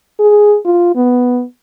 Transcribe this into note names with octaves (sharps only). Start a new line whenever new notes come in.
G#4
F4
B3